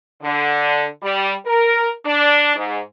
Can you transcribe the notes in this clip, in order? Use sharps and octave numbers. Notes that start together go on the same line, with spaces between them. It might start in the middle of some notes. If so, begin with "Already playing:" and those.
D3
G3
A#4
D4
G#2